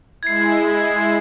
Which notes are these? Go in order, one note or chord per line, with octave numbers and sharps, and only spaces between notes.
G#3 E4 G#6 C7